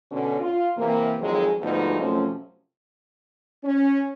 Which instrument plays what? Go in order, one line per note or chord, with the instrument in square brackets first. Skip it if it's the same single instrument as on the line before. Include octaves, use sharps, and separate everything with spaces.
[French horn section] B2 D3 C#4
F4
C3 E3 A#3
F2 D#3 F#3 G#3
D2 G#2 F3 B3 D#4
F#2 C3 F3 A3 C#4
C#4